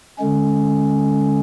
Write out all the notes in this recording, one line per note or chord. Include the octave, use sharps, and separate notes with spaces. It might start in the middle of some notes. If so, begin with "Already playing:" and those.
D3 G#3 C#4